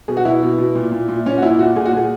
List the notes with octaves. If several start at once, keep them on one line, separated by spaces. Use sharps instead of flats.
B2 G#4
F#4
B2 E4
B2
B2
A#2
A#2
A#2
A#2 C#4
F#4
A#2 E4
A#2 F#4
A#2 G#4
F#4
A#2 G#4